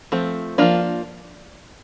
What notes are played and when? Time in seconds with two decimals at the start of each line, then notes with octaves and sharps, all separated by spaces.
0.12 F3 A3 C4
0.58 F3 A#3 D4 F4